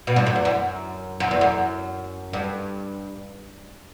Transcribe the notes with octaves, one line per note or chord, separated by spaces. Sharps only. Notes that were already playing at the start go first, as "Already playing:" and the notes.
B2
G2
F#2
E2
F#2
F#2
E2
F#2
G2